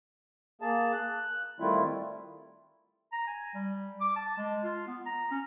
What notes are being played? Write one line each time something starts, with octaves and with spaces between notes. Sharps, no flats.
A#3 G#4 A5
F#6
D#3 G3 A3 C4 E4 F4
A#5
G#5
G3
D6
A5
G#3
F4
B3
A#5
C#4